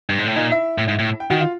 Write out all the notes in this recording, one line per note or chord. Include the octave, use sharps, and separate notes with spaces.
G2
G#2
A2
A#2 D#4 D#5
E4 E5
A2
G#2
A2
G5
D#3 F#4 F#5
F4 F5